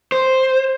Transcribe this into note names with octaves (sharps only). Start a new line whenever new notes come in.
C5